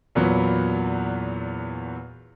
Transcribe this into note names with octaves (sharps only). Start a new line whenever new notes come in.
E2 A#2 E3 F#3 B3